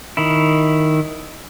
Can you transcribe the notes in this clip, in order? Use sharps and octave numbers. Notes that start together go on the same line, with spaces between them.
D#3 E4